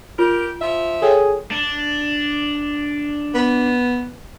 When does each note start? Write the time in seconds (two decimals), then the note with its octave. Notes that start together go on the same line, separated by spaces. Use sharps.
0.19 F4 G4 A#4
0.61 F3 E5
1.02 G#4 A4 C#5 G5
1.51 D4
3.34 B3